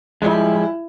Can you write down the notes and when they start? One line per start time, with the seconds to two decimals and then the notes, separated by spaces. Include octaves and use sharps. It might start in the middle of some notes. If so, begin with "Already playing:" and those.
0.22 F3 G3 G#3 E4